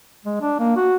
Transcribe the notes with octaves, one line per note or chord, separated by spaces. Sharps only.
G#3
D4
A#3
F#4